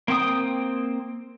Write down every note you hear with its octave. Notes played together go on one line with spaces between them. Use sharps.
A#3 C4 G5 D#6